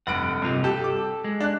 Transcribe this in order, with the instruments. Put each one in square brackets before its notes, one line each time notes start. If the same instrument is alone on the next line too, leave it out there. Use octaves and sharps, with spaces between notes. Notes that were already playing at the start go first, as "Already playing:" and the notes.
[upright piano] F1 B5 D7 [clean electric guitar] G2 F#5
[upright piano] C#2 [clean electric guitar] G2 C3 F4
[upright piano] G4 [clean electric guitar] A4
[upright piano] D6
[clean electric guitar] G#3
[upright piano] D4 F#6